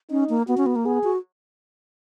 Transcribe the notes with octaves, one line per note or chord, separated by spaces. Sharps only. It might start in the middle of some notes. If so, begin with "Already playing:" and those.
C#4 D#4
A#3
B3 F#4
C#4
B3
A#3
B3 G#4
F#4